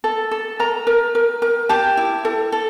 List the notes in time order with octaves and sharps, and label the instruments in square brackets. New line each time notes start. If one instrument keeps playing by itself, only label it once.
[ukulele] A4
A4
A#4 A#5
A#4
A#4
A#4
G4 A5
E4
A4
A4